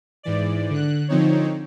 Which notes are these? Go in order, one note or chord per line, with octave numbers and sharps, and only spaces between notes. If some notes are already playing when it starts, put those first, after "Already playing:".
G#2 E3 D5
D3 F#6
D3 F3 C4 D#4 C#5